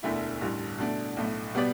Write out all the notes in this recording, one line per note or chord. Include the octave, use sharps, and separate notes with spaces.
E1 D2 D3 A3 E4
A1 G2 D3
B2 A3 D4
B1 A2 A3
B2 G3 B3 G4 D5